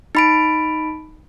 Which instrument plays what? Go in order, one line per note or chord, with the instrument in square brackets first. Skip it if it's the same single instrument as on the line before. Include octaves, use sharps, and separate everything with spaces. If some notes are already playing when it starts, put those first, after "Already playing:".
[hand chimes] D#4 B5 D7